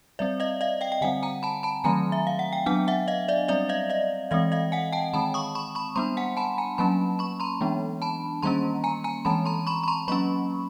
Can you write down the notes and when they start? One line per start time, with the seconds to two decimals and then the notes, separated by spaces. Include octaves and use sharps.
0.19 G3 C4 D5 E5
0.40 D#5 F5
0.61 D#5 F5
0.81 F5 G5
0.92 G5
1.01 D3 G3 C4 F#5 G#5
1.23 G#5 A#5
1.43 A5 B5
1.63 A5 B5
1.84 D#3 F#3 A3 C4 G#5 A#5
2.12 E5
2.27 F5
2.39 F#5
2.53 G5
2.66 F#3 B3 D4 F#5 G#5
2.88 E5 F#5
3.08 D#5 F5
3.28 D5 E5
3.48 G3 C4 D5 E5
3.69 D#5 F5
3.90 D#5 F5
4.31 E3 G#3 C4 D#5 F5
4.52 D#5 F5
4.72 F#5 G#5
4.93 G5 A5
5.13 D#3 G#3 C4 A5 B5
5.34 C#6 D#6
5.55 B5 C#6
5.75 B5 C#6
5.96 G3 B3 D4 A#5 C6
6.17 F#5 G#5
6.37 A5 B5
6.58 G#5 A#5
6.78 F#3 A#3 C#4 A5 B5
7.19 B5 C#6
7.40 A#5 C6
7.61 E3 G#3 B3 D4
8.02 A5 B5
8.43 D#3 G3 A#3 C#4 A#5 C6
8.84 G#5 A#5
9.04 G#5 A#5
9.25 E3 G#3 C4 A5 B5
9.45 A#5 C6
9.67 B5 C#6
9.83 B5
9.88 A#5 C6
10.08 F#3 A#3 C#4 B5 C#6